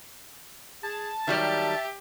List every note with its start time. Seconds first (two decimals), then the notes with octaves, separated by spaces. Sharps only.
0.83 G#4 A5
1.27 D#3 F#3 G3 G4 E5